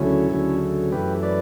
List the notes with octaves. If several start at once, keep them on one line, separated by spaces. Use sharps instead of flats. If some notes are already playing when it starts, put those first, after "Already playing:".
Already playing: D2 C#3 F#3 A3 C#4 E4
D2 C#3 F#3 A3
F#2 E3 A3 G4 B4
B4 D5